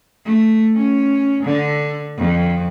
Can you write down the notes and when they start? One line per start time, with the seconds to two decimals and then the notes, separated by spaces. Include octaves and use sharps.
0.25 A3
0.76 C#4
1.44 D3
2.17 F2